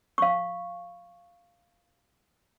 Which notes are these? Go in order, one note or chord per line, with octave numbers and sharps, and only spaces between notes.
F5 C#6